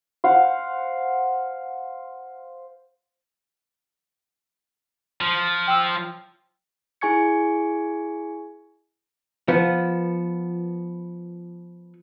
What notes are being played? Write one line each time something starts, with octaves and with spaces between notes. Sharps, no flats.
C5 F5 F#5
F3
G5 E6
E4 G#4 G#5 C#6 G#6 C#7
F3 B3